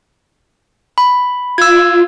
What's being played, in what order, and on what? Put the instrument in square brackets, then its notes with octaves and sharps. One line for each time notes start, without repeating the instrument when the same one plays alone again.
[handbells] B5
[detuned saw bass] F4 [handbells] E6 G#6